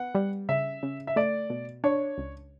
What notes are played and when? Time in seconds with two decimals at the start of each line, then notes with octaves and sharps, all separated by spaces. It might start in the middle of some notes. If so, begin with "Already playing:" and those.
Already playing: B3 F#5
0.15 G3
0.49 C#3 E5
0.83 C#3
1.07 E5
1.16 A3 D5
1.50 B2
1.84 D4 C#5
2.18 C#2